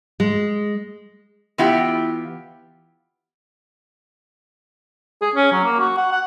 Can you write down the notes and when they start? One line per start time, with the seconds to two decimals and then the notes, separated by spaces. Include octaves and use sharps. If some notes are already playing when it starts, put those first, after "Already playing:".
0.20 G#3
1.58 E3 B3 E4 F4 G4 G5
5.22 G#4
5.36 C#4
5.52 F#3
5.65 A#3
5.80 F#4
5.97 F#5
6.12 F#5